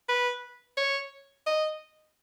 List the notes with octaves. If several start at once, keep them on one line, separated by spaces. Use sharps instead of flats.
B4
C#5
D#5